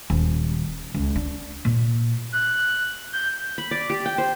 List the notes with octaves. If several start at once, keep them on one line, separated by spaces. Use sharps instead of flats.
D#1
C#2
D4
A#2
F#6
G6
B5
D5
G4
G5
C5